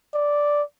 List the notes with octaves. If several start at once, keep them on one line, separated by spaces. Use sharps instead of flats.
D5